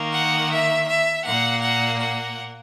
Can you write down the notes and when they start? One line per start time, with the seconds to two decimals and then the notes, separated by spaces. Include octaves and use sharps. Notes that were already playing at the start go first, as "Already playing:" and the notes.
Already playing: D#3 A#3
0.14 F#5
0.51 E5
0.88 E5
1.24 A#2 A#3 F#5
1.61 F#5
1.98 F#5